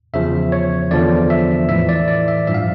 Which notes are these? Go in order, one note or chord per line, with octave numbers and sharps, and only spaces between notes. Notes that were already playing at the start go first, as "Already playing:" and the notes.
E2 C#3 F3 E5
C#5
E2 D3 F3 D5
E5
A2 E3 E5
D5
D5
E5
G2 F3 E5
F5